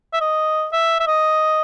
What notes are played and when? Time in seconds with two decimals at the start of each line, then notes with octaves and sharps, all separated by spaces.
0.14 E5
0.21 D#5
0.73 E5
1.00 E5
1.07 D#5